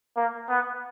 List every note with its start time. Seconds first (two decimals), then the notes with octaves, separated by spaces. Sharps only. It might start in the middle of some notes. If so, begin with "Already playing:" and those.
0.17 A#3
0.49 B3